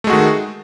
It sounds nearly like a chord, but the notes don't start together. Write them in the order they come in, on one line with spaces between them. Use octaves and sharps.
A3 G#3 F#4 D#3